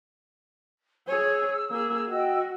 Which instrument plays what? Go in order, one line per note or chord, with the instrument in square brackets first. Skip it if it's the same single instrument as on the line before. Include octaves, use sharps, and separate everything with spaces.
[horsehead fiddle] G#4 C#5 [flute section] E6
[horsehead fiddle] A#3 G#4
[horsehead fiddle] F#4 [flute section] D#5 G5 E6